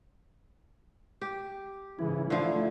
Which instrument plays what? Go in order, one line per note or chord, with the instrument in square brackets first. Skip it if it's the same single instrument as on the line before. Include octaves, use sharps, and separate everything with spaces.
[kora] G4
[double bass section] G#2 C#3 E3 [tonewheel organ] E4
[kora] D3 F3 [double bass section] A3